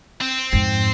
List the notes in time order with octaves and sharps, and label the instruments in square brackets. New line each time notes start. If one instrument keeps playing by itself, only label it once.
[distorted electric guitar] C4
[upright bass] F2 G#2